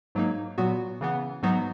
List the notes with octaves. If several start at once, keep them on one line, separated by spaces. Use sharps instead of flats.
G#2 F#3 A#3 D#4
A#2 F#3 B3 F#4
C#3 E3 B3
G#2 F#3 B3 D#4 F#4